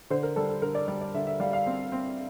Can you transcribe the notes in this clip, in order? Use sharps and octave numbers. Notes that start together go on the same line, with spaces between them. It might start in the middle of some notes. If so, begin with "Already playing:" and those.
D3 C5
A#4
G3 A4
A4
D3 A#4
D5
G3 D5
D5
D3 E5
E5
G3 F5
F5
C4
C4